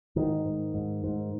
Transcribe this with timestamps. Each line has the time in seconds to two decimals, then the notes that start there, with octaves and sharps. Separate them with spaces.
0.16 G#2 D#3
0.45 G#2
0.74 G#2
1.04 G#2